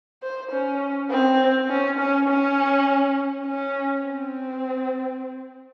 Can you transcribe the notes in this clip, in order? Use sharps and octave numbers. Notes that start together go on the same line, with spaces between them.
C5
C#4
C4
C#4
C#4
C#4
C#4
C4